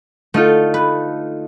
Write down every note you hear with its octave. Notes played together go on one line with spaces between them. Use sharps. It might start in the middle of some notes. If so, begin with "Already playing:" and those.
D3 A3 D#4 F4
B4